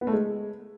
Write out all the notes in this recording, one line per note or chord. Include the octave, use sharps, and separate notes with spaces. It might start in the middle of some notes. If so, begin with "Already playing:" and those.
B3
A3
G#3